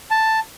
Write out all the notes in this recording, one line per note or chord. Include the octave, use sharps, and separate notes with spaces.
A5